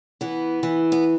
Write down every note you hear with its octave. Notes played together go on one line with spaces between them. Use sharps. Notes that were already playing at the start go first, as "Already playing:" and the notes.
E3 B3
E3
B3